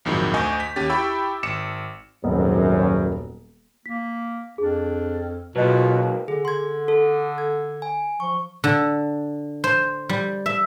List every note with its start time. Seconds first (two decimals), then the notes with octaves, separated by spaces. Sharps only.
0.05 A#1 F2 G#2 D#3 F#3
0.34 D2 D#5 G#5 C#6 D6 G6
0.60 B6
0.76 D#2 C#4 G4 A6
0.89 E4 G4 G5 B5 C#6 E6
1.43 G#1 D6 C#7 E7
2.24 D#1 G#1 F#2 B3 D#5
3.86 A#3 B6
4.58 F2 D4 G#4
5.56 B2 F#3 A#3 F4 B4 D#5
6.28 D3 G#4
6.45 D3 C6 G#6
6.88 A4
7.38 G#6
7.82 G#5
8.20 F3 C#6
8.64 D3
9.64 C5
10.09 G3
10.46 E5